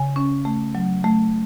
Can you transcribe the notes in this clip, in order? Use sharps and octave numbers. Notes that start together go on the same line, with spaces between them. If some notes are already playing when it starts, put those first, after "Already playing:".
Already playing: C#3 G#5
C#4
A3
F#3
A3